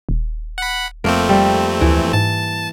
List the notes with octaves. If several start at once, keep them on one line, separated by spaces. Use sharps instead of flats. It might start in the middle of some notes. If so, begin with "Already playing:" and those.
D#1
F#5 B5
F2 A3 A#3 C4
G3
D2 E3
G#2 A5